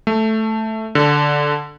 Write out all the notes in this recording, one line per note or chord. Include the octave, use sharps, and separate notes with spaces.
A3
D3